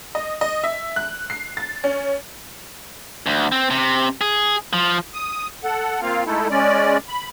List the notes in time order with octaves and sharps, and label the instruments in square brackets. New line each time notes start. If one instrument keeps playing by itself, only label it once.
[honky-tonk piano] D#5
D#5
E5
F#6
C7
A6
C#4
[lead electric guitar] D2
C4
C3
G#4
F3
[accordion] D#6
A4 F#5
A#3 C4 F4 F5
G#3 A3 D#4 E4 A4
G#3 C#4 D5
B5